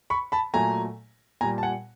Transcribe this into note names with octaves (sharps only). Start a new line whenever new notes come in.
B5 C#6
A5 B5
A#2 F#3 A3 G#5 A#5
A#2 G3 G#5 A#5
A5
F#5 G#5